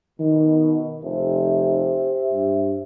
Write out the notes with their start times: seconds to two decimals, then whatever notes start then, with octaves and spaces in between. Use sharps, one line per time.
0.20 B2 D#3
1.02 F1 G4 C5 E5
2.32 G2